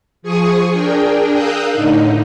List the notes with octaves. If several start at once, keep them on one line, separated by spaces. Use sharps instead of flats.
F3 G#4 G#5 C#6 D#6
D4 G#4 A#4 G5
A#4 F5 D#6 E6 F#6 G6
A2 D3 D#4